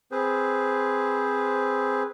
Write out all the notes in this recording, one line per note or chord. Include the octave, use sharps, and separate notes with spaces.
C4 G#4 B4 C5